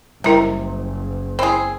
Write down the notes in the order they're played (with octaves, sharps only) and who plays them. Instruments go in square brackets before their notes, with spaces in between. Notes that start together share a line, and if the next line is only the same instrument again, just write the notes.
[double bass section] F#1 [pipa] C3 [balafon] G3 E4 G5 [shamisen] D#4 A#4
[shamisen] G#3 C5 [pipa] C4 G#4 [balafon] E4 B5